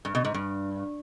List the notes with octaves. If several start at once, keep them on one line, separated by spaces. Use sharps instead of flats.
G2
B2
G#2
G2